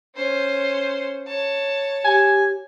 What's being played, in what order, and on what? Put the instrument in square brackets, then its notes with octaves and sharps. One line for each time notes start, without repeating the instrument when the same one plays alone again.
[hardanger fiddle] C#4 C5
C#5 A5
[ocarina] G4 [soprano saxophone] G#5